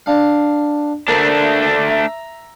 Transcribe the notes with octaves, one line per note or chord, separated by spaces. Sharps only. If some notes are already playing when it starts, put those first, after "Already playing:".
D4 F5
A3 A#3 D4 C5
E5 A#5